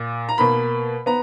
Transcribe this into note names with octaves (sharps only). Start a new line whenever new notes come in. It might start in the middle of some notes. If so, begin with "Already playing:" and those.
Already playing: A#2
A#5
B2 A#3 B5
B3 A#5